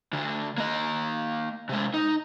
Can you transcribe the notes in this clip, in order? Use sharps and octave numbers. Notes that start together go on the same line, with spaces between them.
D2 D3
A#3 D#5
C3 G#3
D#4